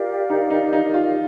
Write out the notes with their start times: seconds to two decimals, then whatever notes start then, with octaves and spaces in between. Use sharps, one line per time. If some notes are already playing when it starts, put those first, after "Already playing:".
Already playing: F4 G4 A#4 D5 F5
0.30 D#4
0.50 D#4
0.73 D#4
0.94 F4